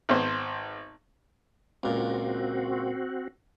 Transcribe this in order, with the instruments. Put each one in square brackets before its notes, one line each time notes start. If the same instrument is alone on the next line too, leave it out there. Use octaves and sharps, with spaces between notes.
[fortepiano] G#1 B3 C5
[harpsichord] C#2 A#2 [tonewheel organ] C4 F#4